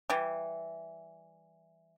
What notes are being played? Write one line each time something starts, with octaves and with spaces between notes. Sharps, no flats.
E3 G3